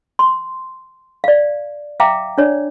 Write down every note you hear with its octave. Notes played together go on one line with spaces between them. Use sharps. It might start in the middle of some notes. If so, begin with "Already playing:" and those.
C6
D5 F5
E5 F5 G5 A#5 D6
D4 C#5 D5